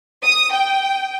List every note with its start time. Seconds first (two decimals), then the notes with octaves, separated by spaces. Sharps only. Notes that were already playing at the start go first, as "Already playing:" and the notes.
0.24 D#6
0.53 G5